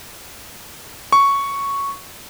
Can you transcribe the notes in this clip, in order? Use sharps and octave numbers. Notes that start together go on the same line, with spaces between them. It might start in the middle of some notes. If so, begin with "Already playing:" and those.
C#6